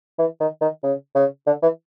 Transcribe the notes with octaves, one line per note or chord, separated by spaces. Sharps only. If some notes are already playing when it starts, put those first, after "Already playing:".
E3
D#3
D#3
C#3
C#3
D3
E3